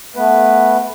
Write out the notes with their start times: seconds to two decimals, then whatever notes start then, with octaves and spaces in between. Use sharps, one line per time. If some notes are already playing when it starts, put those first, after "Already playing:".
0.16 A3 B3 B4